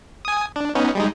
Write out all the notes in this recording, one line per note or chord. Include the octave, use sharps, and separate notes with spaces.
G#5 D#6
D4
B3 C#4 D#4
G3 G#3 D#4